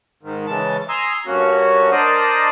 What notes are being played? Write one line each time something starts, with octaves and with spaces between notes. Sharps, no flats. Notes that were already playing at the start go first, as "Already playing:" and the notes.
G#2 D#3
C#3 E3 G#3 A5
G#5 A#5 C6 D#6 E6
G2 A#3 C#4 F#4
D4 A#4 C5 D5 D#5 D#6